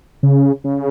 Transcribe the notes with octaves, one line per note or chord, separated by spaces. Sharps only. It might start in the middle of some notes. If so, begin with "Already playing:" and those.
C#3
C#3